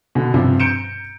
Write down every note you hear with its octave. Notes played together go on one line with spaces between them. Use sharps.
B2 D3
G2 C3 F3 C4
A#5 G6 C#7 D7 E7